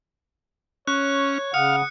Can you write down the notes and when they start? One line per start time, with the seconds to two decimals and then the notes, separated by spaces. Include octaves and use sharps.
0.87 C#4 C#5 F#6
1.54 C#3 F5 F#5 D#6 C#7